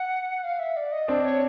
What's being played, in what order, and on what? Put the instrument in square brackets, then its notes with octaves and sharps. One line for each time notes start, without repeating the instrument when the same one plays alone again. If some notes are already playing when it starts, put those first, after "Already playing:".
Already playing: [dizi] F#5
F5
E5
D5
D#5
[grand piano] C4 D4 [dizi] D5
[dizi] C#5